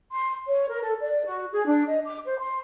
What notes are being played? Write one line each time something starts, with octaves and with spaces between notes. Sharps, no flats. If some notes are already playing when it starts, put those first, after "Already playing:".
C6
C#5
A#4
A4
D5
F#4
G#4
D4
D#5
D6
C5
C6